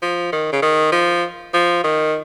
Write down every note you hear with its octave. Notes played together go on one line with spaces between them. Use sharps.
F3
D#3
C#3
D#3
F3
F3
D#3